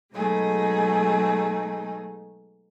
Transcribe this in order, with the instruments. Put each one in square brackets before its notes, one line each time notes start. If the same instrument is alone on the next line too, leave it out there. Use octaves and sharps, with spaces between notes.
[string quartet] B2 F#3 G#3 A3 D#4 G#4